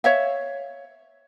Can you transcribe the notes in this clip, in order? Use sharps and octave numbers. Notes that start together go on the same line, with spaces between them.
C#5 E5 F5